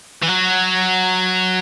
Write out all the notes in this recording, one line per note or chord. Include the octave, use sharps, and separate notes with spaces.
E3
F#3